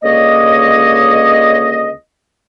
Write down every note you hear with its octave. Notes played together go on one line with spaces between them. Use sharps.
C#2 D3 A#3 C#5 D#5